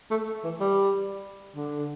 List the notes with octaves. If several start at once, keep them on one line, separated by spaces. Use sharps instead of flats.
A3
E3
G3
D3